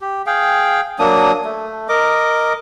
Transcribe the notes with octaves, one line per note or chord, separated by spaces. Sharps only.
G4
G#4 F5 G5
F#3 A#3 D4 D#6
A3
A#4 D#5 D6